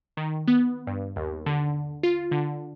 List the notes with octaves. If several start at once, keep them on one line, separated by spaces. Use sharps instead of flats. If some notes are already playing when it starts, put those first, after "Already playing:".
D#3
B3
G2
D#2
D3
F4
D3